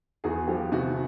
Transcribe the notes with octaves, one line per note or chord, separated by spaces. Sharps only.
E2 F#4 G#4
F3 G4 A4
C3 E4 F#4